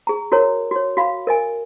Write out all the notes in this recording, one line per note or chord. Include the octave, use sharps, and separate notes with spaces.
G#4 A#5
F#4 A#4 C#5 A#5
F#4 C#5
F#4 F5 B5
A#4 D#5 G#5